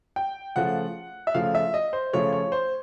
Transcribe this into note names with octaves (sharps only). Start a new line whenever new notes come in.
G5
C#3 F3 A3 F#5
E5
C#3 F3 A3 F5
E5
D#5
C5
C#3 F3 A3 C#5
C#5
C5